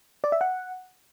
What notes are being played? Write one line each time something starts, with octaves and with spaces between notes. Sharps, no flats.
D5
E5
F#5